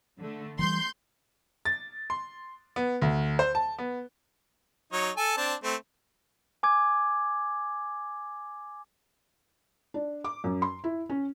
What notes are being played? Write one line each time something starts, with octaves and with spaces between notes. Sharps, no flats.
D3 A3
E3 F#3 G3 C6 G6
A6
C6
B3
D2
C5
A5
B3
F#3 D#4 C#5
A4 G#5 A5
C4 D4 A5
A3 C4
G#5 D6 G#6
D4
D6
F#2
C6
E4
C#4